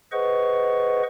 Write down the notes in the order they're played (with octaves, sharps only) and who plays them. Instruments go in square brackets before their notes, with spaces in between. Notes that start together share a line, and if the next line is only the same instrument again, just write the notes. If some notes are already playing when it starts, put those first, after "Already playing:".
[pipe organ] G#4 B4 C5 D#5 F#5 C#6